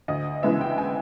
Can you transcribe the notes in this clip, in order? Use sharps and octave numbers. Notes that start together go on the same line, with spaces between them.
D2 D#5
C#3 E3 G#3 B3 E5
G5
G#5